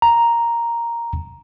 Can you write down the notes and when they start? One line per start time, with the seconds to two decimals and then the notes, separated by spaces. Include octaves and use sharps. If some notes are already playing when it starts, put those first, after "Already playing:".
0.02 A#5